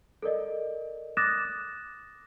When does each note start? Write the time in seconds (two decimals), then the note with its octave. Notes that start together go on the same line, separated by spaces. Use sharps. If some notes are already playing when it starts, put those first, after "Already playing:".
0.22 A4 A#4 D5 D#5
1.17 D6 D#6 F#6 A6 A#6 E7